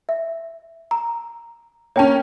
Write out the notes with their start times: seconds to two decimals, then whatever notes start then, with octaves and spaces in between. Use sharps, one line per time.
0.09 E5
0.91 A#5
1.96 A#3 C#4 C#5 G5 A5